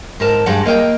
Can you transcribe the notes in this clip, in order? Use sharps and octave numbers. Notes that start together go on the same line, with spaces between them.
G#2 A#4 A5
G2 G#3 G4 D5 F#5
A#3 D#5 E5 G5